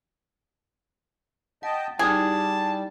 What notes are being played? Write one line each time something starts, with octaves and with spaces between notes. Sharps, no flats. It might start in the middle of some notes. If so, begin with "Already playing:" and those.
D#5 F#5 G5 A5
G3 D#4 E4 G#4 A5